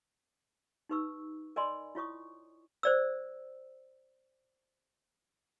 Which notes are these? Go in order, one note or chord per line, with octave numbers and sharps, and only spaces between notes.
D#4 G4 B4 C#6 E6
A#4 D5 D#5 G#5 B5 C6
E4 F4 C#5 C#6 D#6
C5 D5 E6